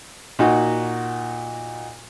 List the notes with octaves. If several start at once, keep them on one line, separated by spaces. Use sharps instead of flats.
A#2 D#4 F#4